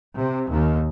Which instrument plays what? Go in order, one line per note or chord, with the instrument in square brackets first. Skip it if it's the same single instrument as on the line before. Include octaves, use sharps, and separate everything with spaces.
[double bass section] C3
D#2